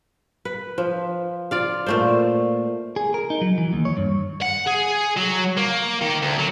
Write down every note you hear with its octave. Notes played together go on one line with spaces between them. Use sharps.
B4
F3
F4 D5 F5
A#2 A3 C5
G#4
A#4
D#4
F#3
E3
D#2
C#5
G2
F#5
G#4
F#3
A#3
D#3
D2
F#3